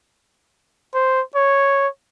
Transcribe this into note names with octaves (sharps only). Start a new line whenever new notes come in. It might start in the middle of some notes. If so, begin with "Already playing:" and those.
C5
C#5